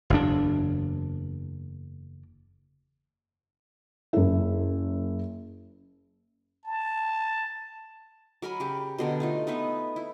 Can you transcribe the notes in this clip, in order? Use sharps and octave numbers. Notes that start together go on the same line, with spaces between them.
F#1 E2 D4
F#1 E4
A5
F#3 A#4 G#5 B5
C#3 G4
B2 D3 A#4
A3 D#4 F4
B3 D#4 B4 E5
E4